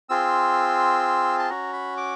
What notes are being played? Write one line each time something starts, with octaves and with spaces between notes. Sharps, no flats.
C4 F4 G#4 E6
A5
C#4 F#4 A#5
B5
D6